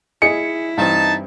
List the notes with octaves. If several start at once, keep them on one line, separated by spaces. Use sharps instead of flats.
E4 G#4 D#5 G#5 C#7
G2 E3 C4 D#4 A5